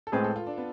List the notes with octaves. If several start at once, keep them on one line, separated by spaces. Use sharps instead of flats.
A4
A2 G#3 C4 G#4 B4
A4
F4
D4
B3